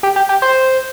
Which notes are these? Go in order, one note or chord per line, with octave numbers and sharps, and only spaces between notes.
G4
G4
G4
C5